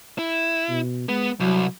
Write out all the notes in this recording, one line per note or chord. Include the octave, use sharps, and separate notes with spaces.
E4
B2
G#3 B3
C2 F#3